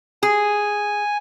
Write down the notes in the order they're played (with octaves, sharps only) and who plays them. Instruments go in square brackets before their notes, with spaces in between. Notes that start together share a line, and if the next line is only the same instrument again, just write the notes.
[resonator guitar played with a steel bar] G#4 [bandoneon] G#5